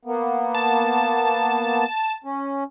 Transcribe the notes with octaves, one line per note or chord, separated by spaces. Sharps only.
A#3 B3
A5
C#4